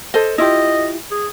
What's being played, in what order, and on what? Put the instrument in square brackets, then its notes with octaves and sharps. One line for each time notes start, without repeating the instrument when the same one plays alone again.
[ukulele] A4 C5 D#5
[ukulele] E4 F4 G4 [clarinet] D#5
[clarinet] G#4